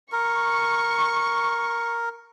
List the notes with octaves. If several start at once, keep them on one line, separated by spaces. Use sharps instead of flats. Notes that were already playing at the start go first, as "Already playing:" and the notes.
A#4 C#6